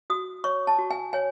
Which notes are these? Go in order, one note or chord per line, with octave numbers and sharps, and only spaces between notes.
F#4 D#6
C#5 C#6
A5
F#4
G#5
C#5 G#5